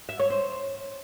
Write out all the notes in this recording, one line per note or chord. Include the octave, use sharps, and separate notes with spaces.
E5
C#5
C5